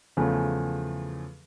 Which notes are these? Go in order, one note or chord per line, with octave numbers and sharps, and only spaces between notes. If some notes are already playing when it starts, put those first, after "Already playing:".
E2 C#3 F3 A3